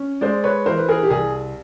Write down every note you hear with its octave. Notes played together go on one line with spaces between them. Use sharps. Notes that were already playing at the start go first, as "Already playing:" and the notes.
Already playing: C#4
G#3 C5 D5
B4 C#5
E3 A#4 C5
B4
G#4 A#4
G4
C2 G#4